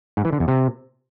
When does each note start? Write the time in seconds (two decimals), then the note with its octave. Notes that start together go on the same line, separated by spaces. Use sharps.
0.17 G#2
0.25 E3
0.33 D3
0.40 E2
0.48 C3